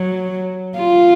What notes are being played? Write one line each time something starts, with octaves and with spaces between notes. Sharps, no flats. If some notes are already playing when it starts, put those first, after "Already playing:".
Already playing: F#3
F4